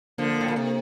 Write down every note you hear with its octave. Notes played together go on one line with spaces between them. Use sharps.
D3 F3 A#3
A2
A#2
C3